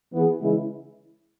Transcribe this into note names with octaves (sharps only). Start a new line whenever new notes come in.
E3 B3 G#4
C#3 E3 G#3 E4